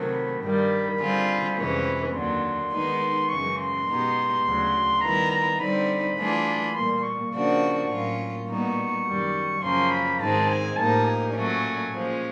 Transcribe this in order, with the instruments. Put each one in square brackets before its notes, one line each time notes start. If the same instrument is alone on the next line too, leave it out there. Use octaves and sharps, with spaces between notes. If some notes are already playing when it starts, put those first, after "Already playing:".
Already playing: [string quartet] C3 D#3 F#3 A3
[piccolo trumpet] B5
[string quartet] G2 D#3 G3 [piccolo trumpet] B5
[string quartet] D3 G3 C4 F4 G#4
F2 C3 E3 G#3 C#4
[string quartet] D#2 D3 F#3 [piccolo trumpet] C6
[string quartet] D#3 G#3 B3 D#4
[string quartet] F#2 C#3 E3 G#3 C#4 [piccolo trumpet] C#6
[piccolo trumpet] C6
[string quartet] B2 G#3 B3 D#4 G4
D2 C#3 F#3
[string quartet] D#3 G3 B3 E4 [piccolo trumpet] A#5
[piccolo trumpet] A#5
[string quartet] D3 G3 C4 D#4 [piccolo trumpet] B5
[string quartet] E3 A3 D4 F4 G#4
[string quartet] A#2 G3 A#3 [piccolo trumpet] C6
[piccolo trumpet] C#6
[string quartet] C#3 F3 A#3 D4 F#4 [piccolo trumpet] C#6
[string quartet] A2 F#3 A#3 C#4 F4
[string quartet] A#2 G3 B3 D#4 F#4 [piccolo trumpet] C#6
[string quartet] F#2 D#3 G3
[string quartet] F#2 C#3 F3 A#3 C#4 [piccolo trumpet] C6
[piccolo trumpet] B5
[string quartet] G#2 D#3 G#3 C4 D#4 [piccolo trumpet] A5
[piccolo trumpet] G#5
[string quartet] A2 F3 A#3 D#4 G4 [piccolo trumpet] A5
[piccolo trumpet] G#5
[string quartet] A#2 F#3 A3 C#4
A#2 F3 G#3 C#4